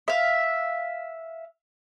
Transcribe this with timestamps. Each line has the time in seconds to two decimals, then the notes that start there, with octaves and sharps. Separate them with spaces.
0.08 E5 F5